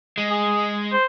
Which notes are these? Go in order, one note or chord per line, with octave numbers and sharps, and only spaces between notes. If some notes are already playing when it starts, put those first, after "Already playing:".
G#3
G#4
C5